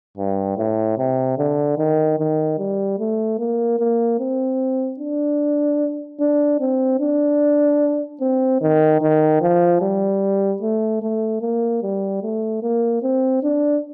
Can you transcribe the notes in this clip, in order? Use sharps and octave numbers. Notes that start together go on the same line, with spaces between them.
G2
A2
C3
D3
D#3
D#3
G3
A3
A#3
A#3
C4
D4
D4
C4
D4
C4
D#3
D#3
F3
G3
A3
A3
A#3
G3
A3
A#3
C4
D4